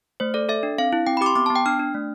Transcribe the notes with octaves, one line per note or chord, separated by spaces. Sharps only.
A3 C5
A4 D5
A4 E5
D4
C4 F5
E4
C4 G5
B5
G4 D6
C6
B3 D6
A5
B3
G5
D4 F6
D4
A3